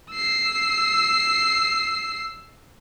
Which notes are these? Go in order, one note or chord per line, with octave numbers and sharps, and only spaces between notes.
E6 C7